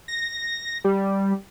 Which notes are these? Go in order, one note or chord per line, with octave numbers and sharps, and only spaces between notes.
A#6
G3